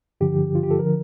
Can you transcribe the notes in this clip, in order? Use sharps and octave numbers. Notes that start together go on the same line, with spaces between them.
G2 D3 F3 G4
F4
G4
A4
D3 F3 A#4